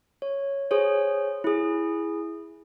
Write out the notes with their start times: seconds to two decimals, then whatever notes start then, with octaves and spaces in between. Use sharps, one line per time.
0.22 C#5
0.71 G#4 C5 C#5
1.44 E4 G#4